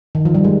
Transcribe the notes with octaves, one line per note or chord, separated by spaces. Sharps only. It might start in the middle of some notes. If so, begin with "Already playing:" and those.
D#3
F3
G3
G#3